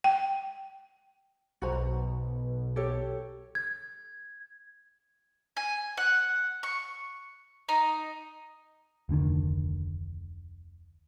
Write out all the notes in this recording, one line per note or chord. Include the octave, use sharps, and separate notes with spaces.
G5
B1 B2 F#4 C5 A#5
G4 A4 C#5
G#6
G#5
F#5
C#6
D#4
F1 D2 D3 D#3